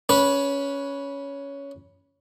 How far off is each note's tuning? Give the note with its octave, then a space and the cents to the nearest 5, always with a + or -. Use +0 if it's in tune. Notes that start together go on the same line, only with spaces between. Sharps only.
C#4 +10 B4 -10